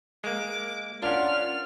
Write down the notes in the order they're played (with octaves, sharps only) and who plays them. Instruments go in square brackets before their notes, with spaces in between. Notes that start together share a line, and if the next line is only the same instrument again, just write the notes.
[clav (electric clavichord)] G#3 A#3 [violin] D6
[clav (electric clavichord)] C#4 D4 [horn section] F4 [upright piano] A#4 D5 F#5 [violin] F6